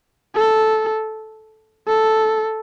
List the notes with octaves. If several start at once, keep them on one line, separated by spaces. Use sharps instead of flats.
A4
A4